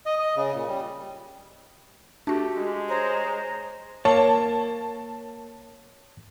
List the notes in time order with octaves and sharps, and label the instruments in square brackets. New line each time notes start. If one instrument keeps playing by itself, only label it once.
[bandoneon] D#5
D#5
C#3
A#2
G3
[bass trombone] A3 [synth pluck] D4 F#4 [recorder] G4
[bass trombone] G#3
[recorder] C5 [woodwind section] C#5 A#5
[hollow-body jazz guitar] A#3 [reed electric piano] C#5 [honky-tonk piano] A5